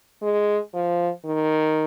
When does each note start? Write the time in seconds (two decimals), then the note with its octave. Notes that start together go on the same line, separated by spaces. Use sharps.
0.22 G#3
0.74 F3
1.25 D#3